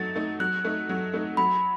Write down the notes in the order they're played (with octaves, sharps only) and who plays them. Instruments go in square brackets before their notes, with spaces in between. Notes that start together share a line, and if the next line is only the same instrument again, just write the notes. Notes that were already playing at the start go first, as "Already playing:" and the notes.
Already playing: [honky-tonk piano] F#3 A3 D#4 [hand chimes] A6
[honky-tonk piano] A3 D#4
[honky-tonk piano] F#3 [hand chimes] F#6
[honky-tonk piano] A3 D#4
F#3
A3 D#4
[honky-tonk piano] F#3 [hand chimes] B5